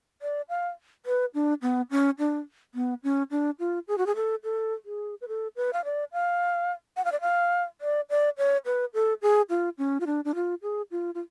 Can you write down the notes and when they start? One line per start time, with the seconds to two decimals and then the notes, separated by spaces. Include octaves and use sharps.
0.22 D5
0.49 F5
1.06 B4
1.34 D4
1.62 B3
1.91 C#4
2.19 D4
2.75 B3
3.03 C#4
3.31 D4
3.60 F4
3.88 G#4
3.98 F#4
4.06 G#4
4.16 A4
4.44 A4
4.85 G#4
5.21 B4
5.28 A4
5.56 B4
5.73 F5
5.85 D5
6.13 F5
6.97 F#5
7.05 F5
7.12 D5
7.21 F5
7.81 D5
8.10 D5
8.38 C#5
8.66 B4
8.94 A4
9.22 G#4
9.50 F4
9.78 C#4
10.00 F4
10.06 D4
10.25 D4
10.35 F4
10.62 G#4
10.91 F4
11.15 F4